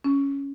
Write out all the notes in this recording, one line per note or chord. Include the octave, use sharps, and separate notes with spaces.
C#4